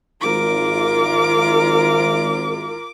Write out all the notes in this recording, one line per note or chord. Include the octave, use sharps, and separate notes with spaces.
G#1 F4 A#4 D6